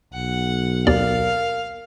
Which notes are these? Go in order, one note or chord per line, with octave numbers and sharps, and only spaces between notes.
B1 F#5
D#2 B3 A#4 D5 F5